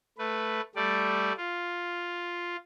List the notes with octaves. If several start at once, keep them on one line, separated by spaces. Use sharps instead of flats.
A3 B4
G3 A3 D5
F4